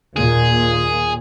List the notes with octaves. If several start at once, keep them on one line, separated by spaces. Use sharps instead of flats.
D#2 A#2 G#4